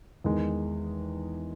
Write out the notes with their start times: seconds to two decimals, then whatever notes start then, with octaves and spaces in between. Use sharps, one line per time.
0.24 E2 D#3 G#3